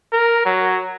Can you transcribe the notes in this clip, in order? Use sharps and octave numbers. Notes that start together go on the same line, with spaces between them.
A#4
F#3